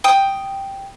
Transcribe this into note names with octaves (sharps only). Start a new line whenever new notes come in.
G5 D#6